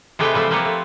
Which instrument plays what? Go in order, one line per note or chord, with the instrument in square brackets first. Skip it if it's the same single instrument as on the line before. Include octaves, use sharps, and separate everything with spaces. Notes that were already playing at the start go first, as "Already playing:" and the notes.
[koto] C3 G#3 A3 G4 B4 G5
E3 F3 G3 A3 C4
F3 A#3 C4 G4 B4 C#5
A3